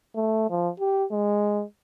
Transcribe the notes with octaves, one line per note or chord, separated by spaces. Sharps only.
A3
F3
G4
G#3